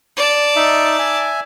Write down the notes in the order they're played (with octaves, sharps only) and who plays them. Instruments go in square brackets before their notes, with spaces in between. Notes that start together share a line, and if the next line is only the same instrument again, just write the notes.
[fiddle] D5 A5
[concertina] D#4 E5
E5 G#5